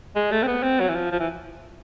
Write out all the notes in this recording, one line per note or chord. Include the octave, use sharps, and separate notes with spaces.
G#3
A3
C4
B3
C4
F#3
E3
F3
F3
E3